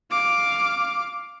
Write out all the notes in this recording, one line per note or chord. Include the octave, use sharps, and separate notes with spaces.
F5 D6